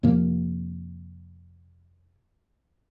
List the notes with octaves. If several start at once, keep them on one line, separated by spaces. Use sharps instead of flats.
F2 C3 F3 A#3